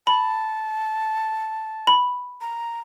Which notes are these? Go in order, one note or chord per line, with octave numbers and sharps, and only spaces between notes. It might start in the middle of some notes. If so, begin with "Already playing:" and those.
A5 B5
B5
A#5